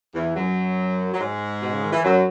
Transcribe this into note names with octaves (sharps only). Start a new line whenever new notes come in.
E2 E3
F#2 F#3
F#3
G#2 G#3
B2
C#3
D#3
E3
F#2 F#3